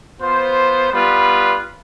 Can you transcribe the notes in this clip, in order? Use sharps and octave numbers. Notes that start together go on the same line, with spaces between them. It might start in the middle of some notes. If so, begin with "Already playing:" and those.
B3 F4 C5
G3 B3 F4 B4